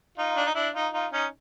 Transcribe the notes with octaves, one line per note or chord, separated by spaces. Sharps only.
D#4 F4
D4
D#4
D4 E4
D#4 F4
D#4 F4
C#4 D#4